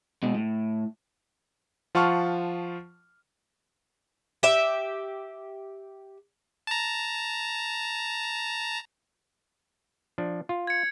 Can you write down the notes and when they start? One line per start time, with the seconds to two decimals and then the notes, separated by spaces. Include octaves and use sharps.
0.23 B2 G#3
0.35 A2
1.95 F3 F4 F#5 A5 C#6 F6
4.43 G4 E5
6.67 A5 A#5
10.18 F3 D4
10.49 F4
10.67 G#6 C#7